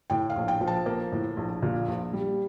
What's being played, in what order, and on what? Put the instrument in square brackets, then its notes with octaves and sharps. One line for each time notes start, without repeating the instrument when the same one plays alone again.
[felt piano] A2 G5
F5
A#1
G5
F3
A5
A#3
A2
A#1
A#2
A#1
G3